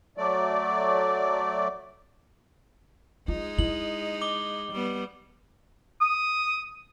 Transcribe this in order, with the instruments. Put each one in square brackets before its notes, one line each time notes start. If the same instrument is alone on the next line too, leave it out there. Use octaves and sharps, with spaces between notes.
[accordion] F#3 A3 D5
[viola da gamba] G#3 D#4 [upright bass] F4
[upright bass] E4 [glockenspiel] F#7
[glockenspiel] D6 G7
[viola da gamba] G3 B3
[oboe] D#6